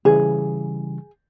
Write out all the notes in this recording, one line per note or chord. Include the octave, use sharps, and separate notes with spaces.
C#3 E3 G3 G#4